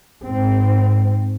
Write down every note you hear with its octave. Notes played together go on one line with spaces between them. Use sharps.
G#2 C4